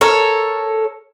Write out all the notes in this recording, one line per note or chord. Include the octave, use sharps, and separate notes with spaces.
A4 A#4 C#5